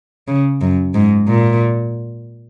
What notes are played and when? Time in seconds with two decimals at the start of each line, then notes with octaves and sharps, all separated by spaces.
0.28 C#3
0.61 F#2
0.94 G#2
1.28 A#2